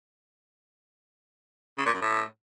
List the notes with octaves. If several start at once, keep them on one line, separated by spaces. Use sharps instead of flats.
C#3
A#2
F#2
A2